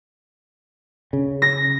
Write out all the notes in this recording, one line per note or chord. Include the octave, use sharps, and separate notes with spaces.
C#3
A#6